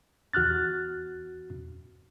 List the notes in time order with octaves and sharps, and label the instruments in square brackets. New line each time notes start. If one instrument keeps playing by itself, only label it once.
[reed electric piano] E2 F#4 F6 F#6 A6